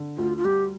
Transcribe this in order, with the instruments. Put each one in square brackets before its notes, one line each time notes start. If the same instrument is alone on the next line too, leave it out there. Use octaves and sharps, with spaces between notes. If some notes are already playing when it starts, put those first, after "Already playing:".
Already playing: [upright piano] D3
[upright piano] D2 [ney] F4
[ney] F4
[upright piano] G3 [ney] G4